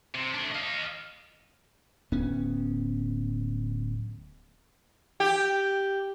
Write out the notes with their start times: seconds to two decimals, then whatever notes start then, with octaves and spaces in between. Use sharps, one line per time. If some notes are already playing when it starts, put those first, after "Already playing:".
0.14 C3
0.34 A3 D4
0.51 D#5 F5
2.12 D1 B3 C#4
5.20 G4